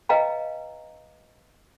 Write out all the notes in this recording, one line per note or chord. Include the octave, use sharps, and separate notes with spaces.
B4 D#5 F5 G5 A#5